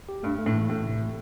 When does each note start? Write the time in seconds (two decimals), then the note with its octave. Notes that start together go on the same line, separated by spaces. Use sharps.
0.09 G4
0.23 G2 A3
0.38 A3
0.46 A2
0.54 E3
0.70 A2 A3
0.86 C3
1.01 C3